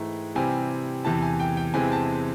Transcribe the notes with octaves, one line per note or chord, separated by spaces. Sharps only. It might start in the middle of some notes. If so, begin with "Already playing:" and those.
Already playing: G#2 E3 A3 G5
C3 E3 G3 C4 G#5
E2 C3 E3 A5
G#5
G5
G5
E2 C3 E3 G#3 C4 G#5
A5